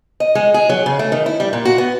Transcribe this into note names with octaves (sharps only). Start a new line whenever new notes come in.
D#5
G#3
G#4
F#3
C#3
A3
D#3
E4
G3
A#2
F#4
B3